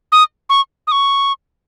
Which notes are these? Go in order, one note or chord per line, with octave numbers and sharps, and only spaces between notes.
D#6
C#6
D#6
C#6